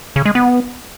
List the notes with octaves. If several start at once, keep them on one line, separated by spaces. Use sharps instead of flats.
C#3
G#3
B3